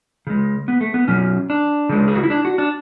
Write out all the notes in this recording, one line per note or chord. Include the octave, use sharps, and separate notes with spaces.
C#3 G#3
B3
A3
B3
B2 F#3 C#4
D4
C#3 G#3
G#4
F#4
E4
D4
F#4
D4